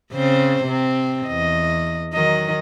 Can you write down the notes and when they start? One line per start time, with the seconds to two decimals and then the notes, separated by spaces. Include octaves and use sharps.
0.13 C#3 C4 C5
0.65 C3 C4
1.28 E2 D#5
2.13 D#3 F#3 D#5